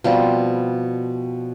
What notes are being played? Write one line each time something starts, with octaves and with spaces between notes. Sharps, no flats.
B2 F3 G3 C4